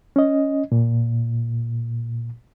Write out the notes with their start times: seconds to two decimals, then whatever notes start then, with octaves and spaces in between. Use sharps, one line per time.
0.16 C#4 D#5
0.72 A#2